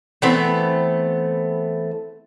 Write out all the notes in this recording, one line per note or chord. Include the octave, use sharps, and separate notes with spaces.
E3 A3 B3 C4